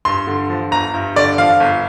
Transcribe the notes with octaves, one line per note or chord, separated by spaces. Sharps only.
G2 C6
D3
F3
G1 A#5
G2
D3 D5
F3 F5
G1